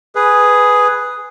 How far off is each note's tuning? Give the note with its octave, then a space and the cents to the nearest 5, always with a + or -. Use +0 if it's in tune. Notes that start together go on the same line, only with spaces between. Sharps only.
G#4 +0 B4 +0